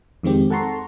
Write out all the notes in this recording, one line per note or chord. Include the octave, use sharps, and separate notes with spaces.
F2 D#3 G#3 C4 G4
A4 F#5 A5 A#5 C6 C#6